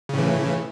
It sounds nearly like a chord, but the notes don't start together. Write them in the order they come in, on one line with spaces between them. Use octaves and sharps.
C#3 A2 E3